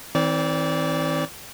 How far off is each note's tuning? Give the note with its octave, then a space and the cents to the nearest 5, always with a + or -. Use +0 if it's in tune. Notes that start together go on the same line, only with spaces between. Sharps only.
E3 -45 C4 +0 D5 -25